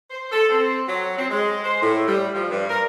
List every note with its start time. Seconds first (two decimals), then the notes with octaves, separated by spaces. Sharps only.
0.10 C5
0.31 A4
0.49 C4
0.86 F#3
1.17 C4
1.30 G#3
1.63 C5
1.81 A2
2.06 G3
2.33 F3
2.51 G2
2.68 A#4